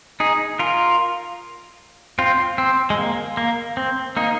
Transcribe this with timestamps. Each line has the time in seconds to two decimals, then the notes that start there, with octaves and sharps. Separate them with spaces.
0.20 D#4 G#4
0.59 F4 A#4
2.19 C4 F4
2.58 C4
2.90 G#3
2.98 A#3
3.37 A#3
3.77 C4
4.17 A#3 D#4